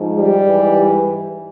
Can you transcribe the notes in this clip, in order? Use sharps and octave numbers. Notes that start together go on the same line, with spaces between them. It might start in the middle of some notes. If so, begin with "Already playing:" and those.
Already playing: G#2 F3
G3
G#2 E3